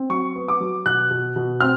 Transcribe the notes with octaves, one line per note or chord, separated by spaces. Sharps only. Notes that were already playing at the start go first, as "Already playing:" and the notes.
Already playing: C4
F#3 C#6
B3
D6
F#3
B2 F#6
B2
B2
C4 F6